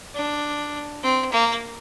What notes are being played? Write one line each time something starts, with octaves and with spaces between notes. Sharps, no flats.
D4
C4
A#3